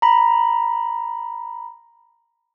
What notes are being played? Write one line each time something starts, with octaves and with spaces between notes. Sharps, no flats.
A#5 B5